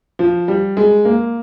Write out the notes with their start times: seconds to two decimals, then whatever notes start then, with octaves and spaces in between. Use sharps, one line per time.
0.19 F3
0.48 G3
0.77 G#3
1.05 A#3